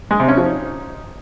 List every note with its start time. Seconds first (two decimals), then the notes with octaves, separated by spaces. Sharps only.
0.11 G#3
0.20 C3
0.28 C#4
0.37 F3
0.46 D#4